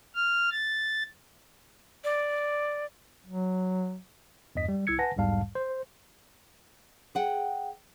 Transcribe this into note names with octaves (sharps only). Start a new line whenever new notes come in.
F6
A6
D5
F#3
E2 G2 D#5 B6
G3
C2 E4 E6 G#6 C#7
B4 F#5 G#5 A5 A#6
B1 E2 G#2 G3 F5 A5
C5
G#4 F#5 G5